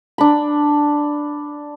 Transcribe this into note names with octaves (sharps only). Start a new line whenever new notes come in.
D4 B5